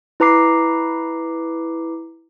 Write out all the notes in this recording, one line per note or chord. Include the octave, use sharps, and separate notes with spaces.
E4 B4 A#5 D6 C7